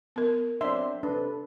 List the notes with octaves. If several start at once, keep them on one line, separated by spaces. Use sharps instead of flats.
B3 A#4
F#3 C4 D4 E5 C6
C3 D4 A4 B4